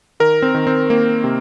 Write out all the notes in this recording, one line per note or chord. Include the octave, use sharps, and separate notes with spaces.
D#3 A#4
C4
D#3
C4
D#3 A#3
C3